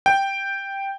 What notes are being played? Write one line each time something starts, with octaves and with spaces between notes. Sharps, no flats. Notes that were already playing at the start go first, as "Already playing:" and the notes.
G5